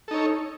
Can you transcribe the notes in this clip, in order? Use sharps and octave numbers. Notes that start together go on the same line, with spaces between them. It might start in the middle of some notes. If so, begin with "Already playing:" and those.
D#4 A4 C#5